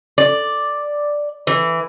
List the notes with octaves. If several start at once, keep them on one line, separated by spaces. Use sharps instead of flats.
D5
E3